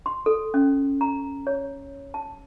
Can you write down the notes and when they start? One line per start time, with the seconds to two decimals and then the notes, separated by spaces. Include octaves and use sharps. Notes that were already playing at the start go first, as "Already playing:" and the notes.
0.06 C6
0.26 A4
0.54 C#4
1.01 A#5
1.47 C#5
2.14 A5